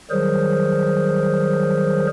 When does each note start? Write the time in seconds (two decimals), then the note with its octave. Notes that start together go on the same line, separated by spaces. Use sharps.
0.11 D#3 F#3 G3 G#4 A#4 C5